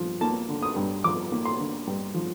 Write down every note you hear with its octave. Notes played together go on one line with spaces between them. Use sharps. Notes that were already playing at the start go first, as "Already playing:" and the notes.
Already playing: G2 F3
A#3 A5
D3
D#6
G2
F3 D6
A#3
C6
D3
G2
F3